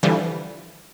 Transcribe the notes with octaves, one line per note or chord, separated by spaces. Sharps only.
D3 E3 F3 G3